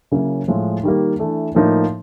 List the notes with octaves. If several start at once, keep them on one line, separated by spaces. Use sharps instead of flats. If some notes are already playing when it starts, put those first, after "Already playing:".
C#3 F#3 A#3 C#4 E4
A2 F3 G#3
D#3 G3 A#3
E3 A3 D4
A2 F3 A#3 D#4